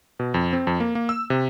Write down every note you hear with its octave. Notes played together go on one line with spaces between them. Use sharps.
B2
F2
C4
F2
A#3
A#3
E6
C3